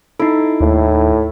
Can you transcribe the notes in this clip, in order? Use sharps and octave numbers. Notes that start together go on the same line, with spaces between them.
D#4 E4 A4
D#2 A2